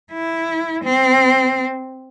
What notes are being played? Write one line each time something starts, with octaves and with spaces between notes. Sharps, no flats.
E4
C4